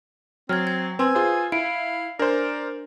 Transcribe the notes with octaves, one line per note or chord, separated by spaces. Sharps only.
F#3 C4 F6 G#6
G#6
C4 B4 G#5 C6 E6
F4 G#4 C5
E4 F5 D7
D4 A#4 C5 D5